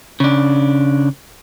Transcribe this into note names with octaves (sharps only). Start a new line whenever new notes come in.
C#3 D4